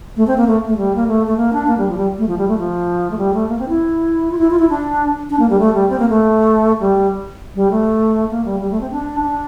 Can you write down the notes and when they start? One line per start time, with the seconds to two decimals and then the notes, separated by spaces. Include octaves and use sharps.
0.17 A3
0.27 C4
0.37 A#3
0.48 A3
0.67 A3
0.77 G3
0.95 A#3
1.08 A3
1.27 A3
1.37 A#3
1.53 D4
1.68 A#3
1.78 G3
1.88 F3
1.97 G3
2.19 A3
2.28 F3
2.38 G3
2.48 A3
2.58 F3
3.11 A3
3.18 G3
3.34 A3
3.49 A#3
3.59 C4
3.69 E4
4.31 F4
4.38 E4
4.51 F4
4.59 E4
4.70 D4
5.30 D4
5.39 A#3
5.50 G3
5.59 A3
5.74 G3
5.90 C4
5.99 A#3
6.09 A3
6.80 G3
7.55 G3
7.71 A3
8.31 A#3
8.45 G3
8.60 G3
8.71 A3
8.81 C4
8.91 D4
9.20 D4